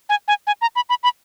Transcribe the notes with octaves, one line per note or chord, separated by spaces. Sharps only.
G#5
G#5
G#5
A#5
B5
B5
B5